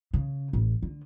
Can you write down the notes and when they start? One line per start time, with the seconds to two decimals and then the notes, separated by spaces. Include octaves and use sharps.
0.13 C#3
0.53 A1
0.82 D3